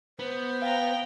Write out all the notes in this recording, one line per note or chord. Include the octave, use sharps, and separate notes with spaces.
B3 C5
F5 G5 A#5